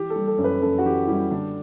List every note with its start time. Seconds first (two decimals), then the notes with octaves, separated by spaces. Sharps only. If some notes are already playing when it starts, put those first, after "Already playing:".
Already playing: E3 G4
0.10 A4
0.16 G3
0.27 A4
0.38 F#2
0.44 B4
0.61 F#2 A4
0.78 F#4
0.85 E3 G4
1.07 G3 E4
1.31 D3 D4